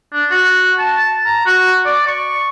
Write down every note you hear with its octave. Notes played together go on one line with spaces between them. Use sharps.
D4
F#4
A5
A#5
F#4
D5
C#6